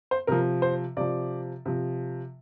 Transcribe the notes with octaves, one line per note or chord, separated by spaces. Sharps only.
C5
C3 F3 A#4
C5
C3 F3 D5
C3 F3